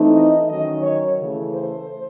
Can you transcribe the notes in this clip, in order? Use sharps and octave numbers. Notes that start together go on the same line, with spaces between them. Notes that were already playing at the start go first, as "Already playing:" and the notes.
Already playing: E3 A3 C4 D#4
D#5
D#3 F#3 C#4 D#5
C#5
C#3 E3 A3
C5